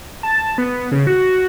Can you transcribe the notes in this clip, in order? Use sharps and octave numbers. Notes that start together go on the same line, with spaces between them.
A5
B3
C#3
F#4